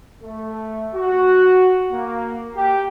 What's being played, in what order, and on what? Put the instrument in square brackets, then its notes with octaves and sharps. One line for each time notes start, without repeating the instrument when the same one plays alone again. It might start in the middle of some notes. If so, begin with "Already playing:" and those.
[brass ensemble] A3
F#4
A#3
G4